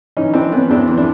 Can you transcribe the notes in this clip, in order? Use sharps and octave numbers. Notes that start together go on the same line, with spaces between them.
E3 C#4 D#4
E3 C4 D4
E3 B3 C#4
E2 C4 D4
E3
D4 E4